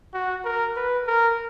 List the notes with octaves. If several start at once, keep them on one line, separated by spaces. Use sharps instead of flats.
F#4
A#4
B4
A#4